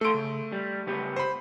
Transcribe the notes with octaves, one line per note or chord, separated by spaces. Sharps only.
A3 A4 C6 D7
C#3
G3
C#2 B3 G4
C5 B5